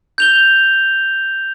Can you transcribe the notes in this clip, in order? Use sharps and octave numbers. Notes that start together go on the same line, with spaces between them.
G6 F7 G7